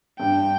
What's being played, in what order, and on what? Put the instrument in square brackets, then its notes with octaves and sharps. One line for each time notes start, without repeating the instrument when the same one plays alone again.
[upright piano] G2 [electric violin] G5